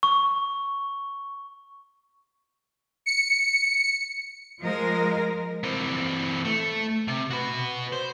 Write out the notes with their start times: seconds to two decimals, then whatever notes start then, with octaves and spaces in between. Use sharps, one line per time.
0.03 C#6
3.06 C#7
4.60 F3 G#3 A#4
5.64 E3 C4
6.45 A3
7.08 C3
7.31 F#4 B4
7.92 C5